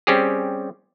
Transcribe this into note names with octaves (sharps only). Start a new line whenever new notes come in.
G3 C4 C#4 G4 G#4